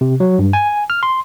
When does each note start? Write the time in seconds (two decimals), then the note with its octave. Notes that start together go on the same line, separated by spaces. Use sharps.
0.01 C3
0.20 F#3
0.39 G2
0.53 G#5
0.90 F6
1.03 C6